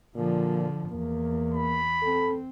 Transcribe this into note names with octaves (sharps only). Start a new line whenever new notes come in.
A#2 D3 F3
E2 A#3
B5
C4 A4